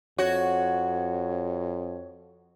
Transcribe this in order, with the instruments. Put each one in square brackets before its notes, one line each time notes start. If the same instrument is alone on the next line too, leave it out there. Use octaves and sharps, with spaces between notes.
[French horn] F2 [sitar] F#4 [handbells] C#5